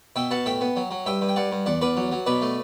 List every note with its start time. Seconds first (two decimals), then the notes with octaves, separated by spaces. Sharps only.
0.16 B2 E5 G5
0.31 B2 F#5 A5
0.46 A2 E5 G5
0.61 B3
0.76 F#3
0.91 F#3
1.06 G2 E5 G5
1.21 G2
1.29 G5
1.36 G2 D5 F#5
1.52 G2
1.66 E2 D5 F#5
1.81 E2 B4 D5
1.97 F#3
2.12 F#3
2.26 B2 B4 D5
2.42 A3